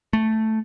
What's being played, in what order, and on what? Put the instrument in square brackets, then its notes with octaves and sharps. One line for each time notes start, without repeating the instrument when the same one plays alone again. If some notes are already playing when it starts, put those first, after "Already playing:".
[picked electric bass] A3